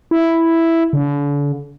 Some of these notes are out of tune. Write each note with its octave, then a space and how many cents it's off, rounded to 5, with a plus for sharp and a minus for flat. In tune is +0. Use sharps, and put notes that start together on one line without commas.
E4 +0
D3 -40